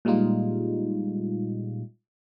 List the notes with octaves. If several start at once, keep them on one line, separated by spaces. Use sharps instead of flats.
A#2 G3 G#3 D#4 F4